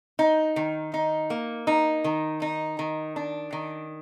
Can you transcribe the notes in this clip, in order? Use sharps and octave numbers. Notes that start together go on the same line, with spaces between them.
D#4
D#3
D#4
A#3
D#4
D#3
D#4
D#3
D4
D#3